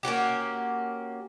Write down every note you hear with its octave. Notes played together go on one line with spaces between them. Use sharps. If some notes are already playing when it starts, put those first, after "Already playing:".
A#3 C#4 F#4 G4